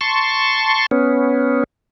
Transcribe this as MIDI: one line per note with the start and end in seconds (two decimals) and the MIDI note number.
0.01 0.86 81
0.01 0.86 84
0.01 0.86 85
0.91 1.64 59
0.91 1.64 61